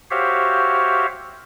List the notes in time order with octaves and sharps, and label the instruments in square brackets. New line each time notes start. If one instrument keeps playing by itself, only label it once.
[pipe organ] F#4 G4 C5 C#5 E5 F5